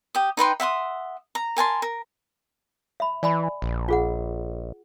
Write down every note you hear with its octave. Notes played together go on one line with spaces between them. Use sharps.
G4 D#6
D#4 B4 G5 C6
E5 F#5 C6 D#6
A#5
A#4 G#5 A5 C6
A#4
E5 B5
E3 D5 G#5 B5
A#1
F4 G#4 F#5